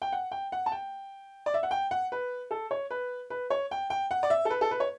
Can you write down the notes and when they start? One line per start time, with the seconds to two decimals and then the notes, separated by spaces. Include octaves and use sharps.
0.02 G5
0.12 F#5
0.32 G5
0.52 F#5
0.66 A5
0.72 G5
1.46 D5
1.54 E5
1.63 F#5
1.71 G5
1.91 F#5
2.12 B4
2.51 A4
2.71 C#5
2.91 B4
3.30 B4
3.50 C#5
3.71 G5
3.90 G5
4.11 F#5
4.23 D5
4.30 E5
4.45 A4
4.50 B4
4.61 A4
4.71 B4
4.80 C#5